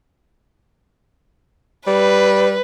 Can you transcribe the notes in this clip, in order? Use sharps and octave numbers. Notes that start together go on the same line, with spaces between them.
G3 B4